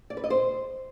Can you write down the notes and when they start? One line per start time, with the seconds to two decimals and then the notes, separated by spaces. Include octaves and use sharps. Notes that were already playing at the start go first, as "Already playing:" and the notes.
0.10 D5
0.17 B4
0.24 D#5
0.30 C5